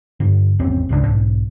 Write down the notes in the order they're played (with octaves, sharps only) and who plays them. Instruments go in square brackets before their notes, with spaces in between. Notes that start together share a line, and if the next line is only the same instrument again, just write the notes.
[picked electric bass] G2 D3
G#1 E2 C4 C#4
G#1 C#2 D3 D4
B1 G#2